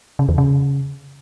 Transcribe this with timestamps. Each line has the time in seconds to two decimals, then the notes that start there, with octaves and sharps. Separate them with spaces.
0.19 C#3
0.29 E2
0.38 C#3